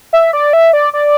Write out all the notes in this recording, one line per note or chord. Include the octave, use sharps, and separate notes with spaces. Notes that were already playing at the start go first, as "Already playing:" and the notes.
E5
D5
E5
D5
D5